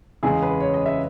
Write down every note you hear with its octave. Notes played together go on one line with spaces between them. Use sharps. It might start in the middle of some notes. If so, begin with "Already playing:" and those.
E2 C#3 G#3 G#4
B4
C#5
D#5
E5